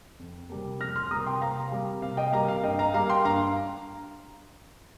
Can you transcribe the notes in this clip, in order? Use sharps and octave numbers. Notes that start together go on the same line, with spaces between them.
F2
C3 G3 A#3
F2 F6 A#6
C6 F6
C3 G3 A#3 A#5 D#6
G5 C6
C3 F5 A#5
G3 A#3
C3 F5
D#5 G5
G3 A#3 F5 A#5
F5
G2 D#5 G5
F5 A#5
G3 A#3 F5 A#5
G5 C6
G2 F5 A#5